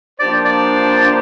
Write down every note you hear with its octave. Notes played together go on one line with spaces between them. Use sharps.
F3 A#3 D4 G4 C5 D5
D5